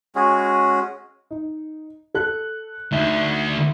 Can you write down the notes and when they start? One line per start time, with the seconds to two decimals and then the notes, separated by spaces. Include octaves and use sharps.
0.15 G#3 C#4 F#4 G#4
1.31 D#4
2.15 A4 F#6
2.91 D2 D#4 E5 G7